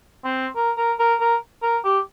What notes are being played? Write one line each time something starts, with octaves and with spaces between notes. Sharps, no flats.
C4
A#4
A#4
A#4
A#4
A#4
G4